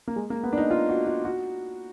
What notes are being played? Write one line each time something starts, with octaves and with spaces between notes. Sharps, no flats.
A#3
G#3
A#3
B3
D4
D#4
F4
F#4
F4
F#4